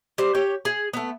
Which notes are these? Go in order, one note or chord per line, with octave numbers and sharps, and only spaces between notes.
G3 C5
G4 C#5 G5
G#4
A3 B3